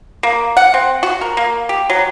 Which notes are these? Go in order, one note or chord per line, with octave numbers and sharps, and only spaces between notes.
A#3
F#5
C4
F#4
A#4
A#3
G4
F#3